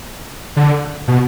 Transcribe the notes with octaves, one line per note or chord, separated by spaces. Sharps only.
D3
B2